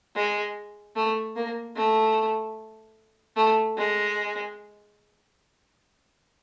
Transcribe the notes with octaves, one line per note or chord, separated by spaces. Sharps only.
G#3
A3
A#3
A3
A3
G#3